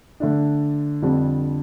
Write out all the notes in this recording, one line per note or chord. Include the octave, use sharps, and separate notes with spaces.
D3 A3 D4
F2 D3 G3 D4